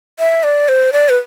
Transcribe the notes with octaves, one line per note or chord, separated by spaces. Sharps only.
E5
D5
C5
D5
B4